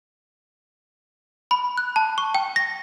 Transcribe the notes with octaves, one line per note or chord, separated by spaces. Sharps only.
B5
F#6
A5
C#6
G5
A#6